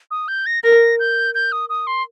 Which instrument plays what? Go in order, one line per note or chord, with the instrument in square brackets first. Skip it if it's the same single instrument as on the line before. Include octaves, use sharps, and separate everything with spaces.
[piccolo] D#6
G6
A#6
[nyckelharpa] A#4 [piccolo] A#6
[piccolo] G6
G6
D#6
D#6
C6